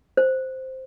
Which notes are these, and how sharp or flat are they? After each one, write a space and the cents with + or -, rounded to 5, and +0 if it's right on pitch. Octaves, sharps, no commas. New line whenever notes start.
C5 +0